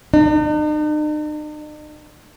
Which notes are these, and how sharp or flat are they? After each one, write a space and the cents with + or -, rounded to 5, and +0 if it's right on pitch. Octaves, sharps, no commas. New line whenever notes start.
D#4 -45